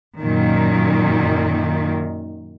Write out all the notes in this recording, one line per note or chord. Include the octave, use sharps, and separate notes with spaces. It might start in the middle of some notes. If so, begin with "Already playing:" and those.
F#2 A#2 D#3